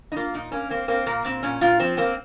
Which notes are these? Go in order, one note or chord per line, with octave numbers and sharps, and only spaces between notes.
D#4
A#3 F4
A#2 D#4
A#3 C#4
A#3 C4
A#3 C4
A#2 A#3
A#2 C4
A#2 C#4
A#2 F4
F3 C4
A#3 C4